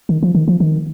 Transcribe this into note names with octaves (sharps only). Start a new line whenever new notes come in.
D#3
F3
D#3
F3
D#3